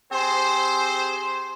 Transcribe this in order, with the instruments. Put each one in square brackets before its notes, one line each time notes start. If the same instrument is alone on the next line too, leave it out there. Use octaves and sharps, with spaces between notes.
[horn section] C4 G4 G#4 C5